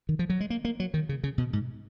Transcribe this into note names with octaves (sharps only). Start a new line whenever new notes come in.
D#3
F3
F#3
G#3
A#3
A#3
F#3
D#3
C#3
C#3
B2
G#2